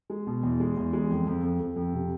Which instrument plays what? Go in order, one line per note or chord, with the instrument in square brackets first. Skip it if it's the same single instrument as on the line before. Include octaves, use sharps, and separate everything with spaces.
[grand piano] G#3
B2
E2
G#3
E2
G#3
F2
F2
F2
F2
F2
C3